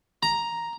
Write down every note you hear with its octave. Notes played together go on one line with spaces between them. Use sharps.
A#5